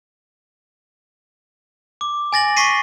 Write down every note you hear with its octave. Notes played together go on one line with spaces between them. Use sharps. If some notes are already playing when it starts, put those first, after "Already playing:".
D6
G#5 A6 A#6 F#7
C#6 A6 B6 C7 D#7